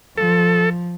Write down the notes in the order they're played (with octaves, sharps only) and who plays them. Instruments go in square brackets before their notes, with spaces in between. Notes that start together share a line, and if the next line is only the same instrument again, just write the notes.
[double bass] F3 [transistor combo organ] A4